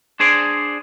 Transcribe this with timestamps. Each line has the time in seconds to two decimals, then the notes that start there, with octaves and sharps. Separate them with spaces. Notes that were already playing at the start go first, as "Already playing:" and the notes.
0.20 D4 G#4 C5 D5